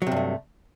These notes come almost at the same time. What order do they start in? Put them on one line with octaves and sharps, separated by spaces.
F#3 C3 G2 A3